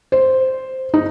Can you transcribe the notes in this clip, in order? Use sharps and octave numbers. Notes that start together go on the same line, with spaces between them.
C5
D#4